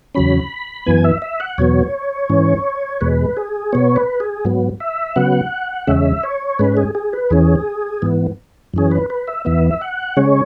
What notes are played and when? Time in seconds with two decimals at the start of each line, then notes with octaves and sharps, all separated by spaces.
0.15 E2 C#3 F#3 C#4 B5
0.86 F#2 E3 B3 G#5
1.04 E5
1.22 E5
1.40 F#5
1.58 E2 B2 F#3 B3 C#5
2.30 G#2 E3 C#4
3.01 E2 B2 G#3 B4
3.37 G#4
3.73 B2 B3 C#5
3.96 B4
4.20 G#4
4.45 G#2 F#3 B3
4.80 E5
5.16 C#3 F#3 B3 F#5
5.87 E2 C#3 G#3 C#4 E5
6.23 C#5
6.59 G#2 G#3 C#4 B4
6.77 G#4
6.95 G#4
7.13 B4
7.30 E2 E3 C#4 G#4
8.02 G#2 E3 B3
8.74 F#2 E3 C#4 G#4
8.91 B4
9.10 B4
9.27 E5
9.45 E2 E3 B3 E5
9.71 E5
9.81 F#5
10.16 C#3 G#3 C#4 C#5